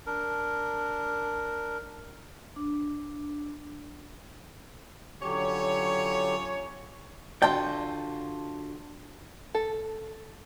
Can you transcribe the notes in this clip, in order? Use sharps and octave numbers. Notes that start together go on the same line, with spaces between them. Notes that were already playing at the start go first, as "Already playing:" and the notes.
D4 A#4
D4
D3 F#3 C#4 F4 G4 C#5
D3 F4 F#4 G5 A5 C6
A4